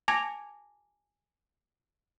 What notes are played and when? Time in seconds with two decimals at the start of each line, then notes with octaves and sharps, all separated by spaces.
0.08 G#5 A5 D6 G#6 A#6 F7